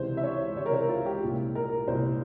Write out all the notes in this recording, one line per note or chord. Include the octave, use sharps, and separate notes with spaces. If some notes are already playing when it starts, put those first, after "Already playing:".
Already playing: C#2 C3 E3 C5
E5
C#5
C#2 C3 E3 C#5
A#4
C5
F4
G4
C2 A#2
A#4
C2 A#2 C5